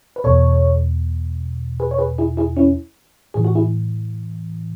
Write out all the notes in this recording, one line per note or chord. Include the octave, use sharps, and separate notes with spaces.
B4
E2 B2 A4 C#5
G#4 B4
C#5
G#4 B4
E4 G#4
E4 G#4
C#4 E4
A2 E3 G#4
F#4
E4 G#4